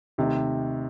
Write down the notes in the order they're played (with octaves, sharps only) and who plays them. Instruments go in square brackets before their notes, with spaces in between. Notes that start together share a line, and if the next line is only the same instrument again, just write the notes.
[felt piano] D#2 D#3 A3 D#4 G4 [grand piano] C3